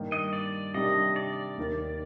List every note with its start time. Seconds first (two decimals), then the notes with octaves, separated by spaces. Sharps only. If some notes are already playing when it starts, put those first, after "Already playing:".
Already playing: G2 D#3 A#3
0.12 D#5
0.33 D5
0.74 C3 D#3 G3 D4 D#5
1.16 D5
1.57 D#2 D#3 A#3